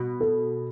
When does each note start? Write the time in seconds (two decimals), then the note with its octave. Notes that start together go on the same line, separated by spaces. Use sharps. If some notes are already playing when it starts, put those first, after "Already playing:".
Already playing: B2
0.20 A4